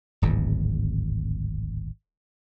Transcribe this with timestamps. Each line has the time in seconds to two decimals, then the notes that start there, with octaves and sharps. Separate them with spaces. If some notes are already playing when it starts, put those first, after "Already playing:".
0.22 D1 G#1 E2